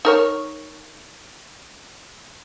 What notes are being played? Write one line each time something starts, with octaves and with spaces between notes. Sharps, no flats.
D#4 A#4 C#5